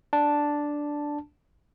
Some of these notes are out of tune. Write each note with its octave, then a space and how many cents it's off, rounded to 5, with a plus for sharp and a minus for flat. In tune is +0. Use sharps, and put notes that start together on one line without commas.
D4 +0 A5 +0